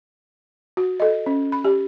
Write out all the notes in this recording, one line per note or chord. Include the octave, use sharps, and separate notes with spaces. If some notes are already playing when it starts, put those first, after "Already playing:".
F#4
A4 D#5
C#4
B5
G4